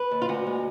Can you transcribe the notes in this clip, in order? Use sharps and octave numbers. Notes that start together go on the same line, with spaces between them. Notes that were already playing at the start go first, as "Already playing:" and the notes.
Already playing: B4
D#2
F4
D2 F#4
G#3